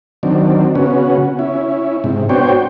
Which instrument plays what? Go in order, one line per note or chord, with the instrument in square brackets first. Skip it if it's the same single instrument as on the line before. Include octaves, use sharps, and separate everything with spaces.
[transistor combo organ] D#3 F#3 C4 D4
C#3 B3 C#4 F#4
C#4 E4
G#2 C3
B3 D4 F#4 C5 C#5 G5